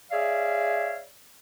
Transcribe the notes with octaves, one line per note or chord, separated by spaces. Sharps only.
G#4 C#5 D5 E5 F5